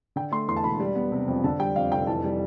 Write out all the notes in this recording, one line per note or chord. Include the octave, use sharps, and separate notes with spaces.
D3 G5
A3 C6
E2 C6
A5
E1 B5
G3
B3
C3
F2
D3 A5
G3 G5
F2 F5
F1 G5
E3 A5
G3